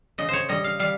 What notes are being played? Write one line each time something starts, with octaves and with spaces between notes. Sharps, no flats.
C#3 D#5
C5 C#5
G3 D#5
F5
G3 F5